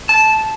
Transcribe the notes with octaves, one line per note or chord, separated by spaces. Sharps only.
A5